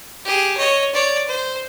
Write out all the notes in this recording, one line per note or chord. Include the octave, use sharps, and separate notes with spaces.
G4 G#4
C#5 D#5
C#5 D5
C5